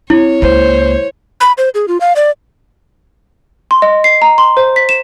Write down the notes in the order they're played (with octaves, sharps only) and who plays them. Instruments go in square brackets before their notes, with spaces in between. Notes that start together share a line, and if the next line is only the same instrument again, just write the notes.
[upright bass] C4 [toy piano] E4 [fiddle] C#5
[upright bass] C#2 A#3 [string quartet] C5
[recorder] B5
C5
G#4
F4
F5
D5
[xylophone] C6
D#5
C7
A#5
C6
C5
B6
E7